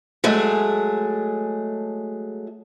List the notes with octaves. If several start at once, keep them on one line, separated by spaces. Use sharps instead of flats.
F#3 G#3 A3 G#4